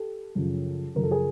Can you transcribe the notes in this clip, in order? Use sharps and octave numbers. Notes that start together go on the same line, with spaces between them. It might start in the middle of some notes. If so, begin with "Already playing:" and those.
Already playing: G4 A4
F#2 C#3 F3
F#2 C#3 F3 A#4
A4
G#4 A#4